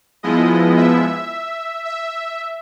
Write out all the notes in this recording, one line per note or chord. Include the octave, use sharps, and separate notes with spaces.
F3 G#3 B3 E4 D#5
E5
E5